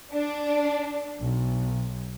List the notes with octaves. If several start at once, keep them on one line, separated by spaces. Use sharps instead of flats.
D4
B1